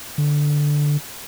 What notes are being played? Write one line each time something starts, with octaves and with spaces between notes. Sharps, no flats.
D3